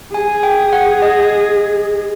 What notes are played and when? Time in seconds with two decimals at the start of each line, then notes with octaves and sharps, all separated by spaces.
0.14 G#4 G#5
0.43 G5
0.73 F#5
1.02 D#5